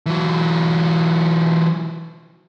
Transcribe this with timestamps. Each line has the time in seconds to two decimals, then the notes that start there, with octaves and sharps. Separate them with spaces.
0.06 E3 F#3